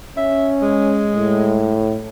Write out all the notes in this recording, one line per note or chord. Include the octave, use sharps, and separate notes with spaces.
C#4 E5
G#3
A2